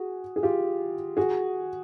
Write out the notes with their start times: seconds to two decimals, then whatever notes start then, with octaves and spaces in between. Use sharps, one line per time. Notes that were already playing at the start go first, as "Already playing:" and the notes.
Already playing: F#4 G#4
0.36 G#4
0.43 F4 G4
1.17 F#4 G#4